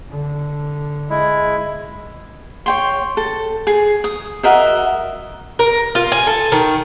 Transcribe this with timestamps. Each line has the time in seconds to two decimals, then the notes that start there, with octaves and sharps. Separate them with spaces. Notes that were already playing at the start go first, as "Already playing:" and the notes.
0.10 D3
1.10 G#3 E4
2.66 C#5 G5 C6
3.17 A4
3.67 G#4
4.04 D#6
4.43 F#4 A#4 D#5 E5
5.59 A#4
5.95 F4
6.12 G#5
6.27 A4
6.52 D#3